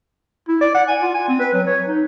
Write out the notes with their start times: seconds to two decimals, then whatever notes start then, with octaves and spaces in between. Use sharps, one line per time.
0.48 E4
0.61 D5
0.74 F#5
0.88 G#5
1.02 F4
1.14 G#5
1.28 C4
1.40 B4
1.53 F#3
1.67 C#5
1.87 D#4